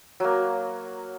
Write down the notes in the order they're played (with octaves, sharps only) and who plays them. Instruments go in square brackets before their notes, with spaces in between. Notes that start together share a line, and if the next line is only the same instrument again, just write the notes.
[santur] F#3 A#3